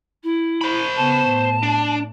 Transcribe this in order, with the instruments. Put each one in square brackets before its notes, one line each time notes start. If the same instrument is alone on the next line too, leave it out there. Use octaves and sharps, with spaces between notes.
[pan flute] E4
[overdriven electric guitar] C5 B5
[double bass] C#3 B3 [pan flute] A5
[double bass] A2
[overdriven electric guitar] D4